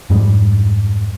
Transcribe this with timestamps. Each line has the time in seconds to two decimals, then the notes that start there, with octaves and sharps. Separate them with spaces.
0.10 F2 G#2 G3 G#3